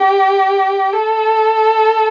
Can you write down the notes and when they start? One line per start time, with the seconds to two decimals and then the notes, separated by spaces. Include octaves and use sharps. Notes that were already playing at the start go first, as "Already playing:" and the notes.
Already playing: G4
0.93 A4